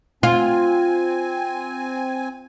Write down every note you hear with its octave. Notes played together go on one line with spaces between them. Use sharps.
C4 F4 G#5